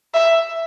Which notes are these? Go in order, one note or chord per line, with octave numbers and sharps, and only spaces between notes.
E5